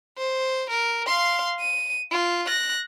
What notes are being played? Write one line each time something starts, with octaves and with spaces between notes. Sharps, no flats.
C5
A#4
F5 C6
D#7
F4
F#6 A#6